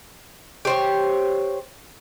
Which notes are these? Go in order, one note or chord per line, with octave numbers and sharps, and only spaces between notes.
G4 C5 C#5